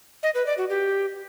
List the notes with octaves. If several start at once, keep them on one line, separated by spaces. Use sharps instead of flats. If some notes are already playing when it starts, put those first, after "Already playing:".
D#5
B4
D5
F#4
G4